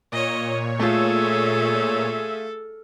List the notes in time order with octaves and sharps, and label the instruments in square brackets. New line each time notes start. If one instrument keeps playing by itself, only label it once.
[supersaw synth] A#2 C#5 [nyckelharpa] D#5
[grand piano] A3 F4 [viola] G#4 E5 [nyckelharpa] A4